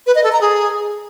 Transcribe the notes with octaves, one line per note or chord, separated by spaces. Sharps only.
B4
D#5
A4
A#5
G#4